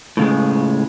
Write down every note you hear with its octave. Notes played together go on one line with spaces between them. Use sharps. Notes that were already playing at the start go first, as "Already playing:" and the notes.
A2 C#3 G#3